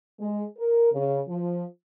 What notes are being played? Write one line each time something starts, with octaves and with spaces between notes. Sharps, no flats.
G#3
A#4
C#3
F3